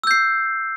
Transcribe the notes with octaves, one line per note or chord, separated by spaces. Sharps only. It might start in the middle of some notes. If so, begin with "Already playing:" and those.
E6 G6 C7